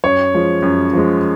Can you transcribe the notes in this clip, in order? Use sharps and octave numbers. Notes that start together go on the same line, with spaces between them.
F#2 C#5
F3 G#3
F#2
F3 G#3